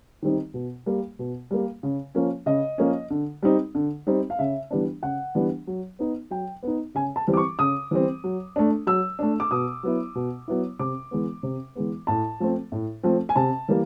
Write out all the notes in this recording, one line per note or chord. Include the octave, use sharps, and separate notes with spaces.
D#3 G3 C4 D#4
B2
G3 A#3
B2
G3 A#3
C#3
F3 A#3 C#4
C#3 D#5
F3 A#3 C#4
D3
G3 C4 D#4
D3
G3 C4 D#4
F5
C#3 E5
E3 G3 B3 D4
C#3 F#5
E3 G3 B3 D4
F#3
B3 D#4
F#3 G5
B3 D#4
C#3 G#5
A5
E3 G3 C4
D6
C#6
C#3 D#6
E3 G3 C4
F#3
A3 D4
F#3 E6
A3 D4
D6
B2 D#6
F#3 B3 E4
B2
F#3 B3 E4
C3 D6
E3 G#3 B3
C3
E3 G#3 B3
A2 A5
F3 A3 C4
A2
F3 A3 C4
G#5
C3 A5
E3 G3 A#3